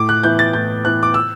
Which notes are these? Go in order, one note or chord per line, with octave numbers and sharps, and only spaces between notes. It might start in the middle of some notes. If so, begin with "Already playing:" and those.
Already playing: A2 D6
F#6
E3 B3 E4 G6
A6
A2 G6
E3 B3 E4 F#6
D6
E6